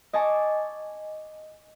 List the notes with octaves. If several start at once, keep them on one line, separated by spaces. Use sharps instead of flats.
D#5 G#5 A5 C#6 D6